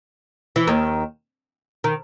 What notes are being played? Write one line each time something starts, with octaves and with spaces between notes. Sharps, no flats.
E3
D#2 D#3
D#3